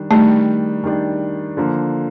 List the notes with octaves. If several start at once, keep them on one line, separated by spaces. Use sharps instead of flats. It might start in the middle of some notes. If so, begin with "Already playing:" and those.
Already playing: D#3 G3 D4
D#3 G3 A3 D4
D#3 G3 D4
D3 F3 A#3